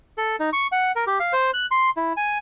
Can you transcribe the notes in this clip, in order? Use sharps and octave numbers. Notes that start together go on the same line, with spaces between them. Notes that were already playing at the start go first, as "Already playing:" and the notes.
A4
D#4
C#6
F#5
A#4
G4
F5
C5
F#6
C6
E4
G#5